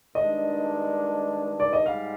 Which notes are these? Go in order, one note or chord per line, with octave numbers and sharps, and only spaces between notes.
G2 D#3 G#3 D4 D#5
D5
D#5
G#2 G3 F5